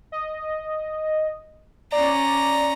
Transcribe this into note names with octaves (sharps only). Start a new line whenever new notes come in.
D#5
C#4 D5 A#5